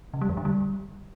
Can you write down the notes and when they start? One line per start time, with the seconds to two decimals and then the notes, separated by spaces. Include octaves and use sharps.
0.14 C#3
0.21 G3
0.29 F2
0.37 D3
0.45 G3